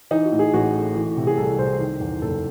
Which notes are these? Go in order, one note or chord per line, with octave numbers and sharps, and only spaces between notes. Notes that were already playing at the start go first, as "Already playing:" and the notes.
E3 D#4
F#4
A2
G#4
A1 F#4
A3
E3
C3
G#4
C2 A4
C2 C5
D#3
E2
F#1 A4